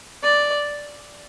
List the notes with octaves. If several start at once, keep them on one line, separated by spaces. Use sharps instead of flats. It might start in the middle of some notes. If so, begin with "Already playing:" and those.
D5